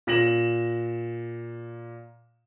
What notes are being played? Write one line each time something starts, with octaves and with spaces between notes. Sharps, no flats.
A#2 A#6 E7 F#7